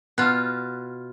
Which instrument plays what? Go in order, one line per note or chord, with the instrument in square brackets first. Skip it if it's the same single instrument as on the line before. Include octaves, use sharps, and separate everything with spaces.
[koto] B2 F4 [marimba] B3 [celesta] F6 F#6